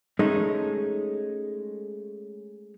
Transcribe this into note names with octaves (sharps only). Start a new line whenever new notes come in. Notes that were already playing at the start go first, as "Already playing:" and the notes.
G#3 A3 C#4 D#4